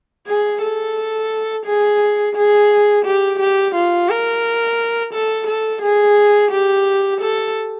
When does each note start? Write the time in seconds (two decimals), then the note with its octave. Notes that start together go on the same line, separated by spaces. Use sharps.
0.27 G#4
0.62 A4
1.66 G#4
2.36 G#4
3.05 G4
3.40 G4
3.75 F4
4.09 A#4
5.13 A4
5.47 A4
5.82 G#4
6.51 G4
7.21 A4